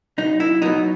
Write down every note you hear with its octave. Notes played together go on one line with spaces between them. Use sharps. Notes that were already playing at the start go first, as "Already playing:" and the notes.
B1 D#4
E4
B2 F#3 D#4